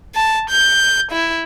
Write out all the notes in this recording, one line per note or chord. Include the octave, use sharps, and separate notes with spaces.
A5
G6
E4